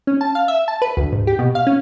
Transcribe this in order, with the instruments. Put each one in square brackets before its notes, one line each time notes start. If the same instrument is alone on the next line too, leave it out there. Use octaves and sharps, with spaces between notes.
[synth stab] C#4
A5
F5
E5
A5
B4
D2
G#2
G4
B2
F5
C#4